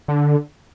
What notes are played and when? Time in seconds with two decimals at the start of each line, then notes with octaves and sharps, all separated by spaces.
0.08 D3